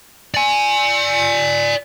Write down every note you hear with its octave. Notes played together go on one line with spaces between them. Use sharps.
D5 G#5